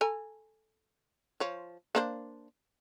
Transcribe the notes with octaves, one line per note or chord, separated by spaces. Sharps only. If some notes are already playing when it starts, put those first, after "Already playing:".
A4 G#5 A#5
F3 C#5
A#3 D4 C5